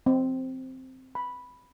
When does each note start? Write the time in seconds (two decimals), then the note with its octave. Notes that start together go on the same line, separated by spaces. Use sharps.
0.06 C4
1.15 B5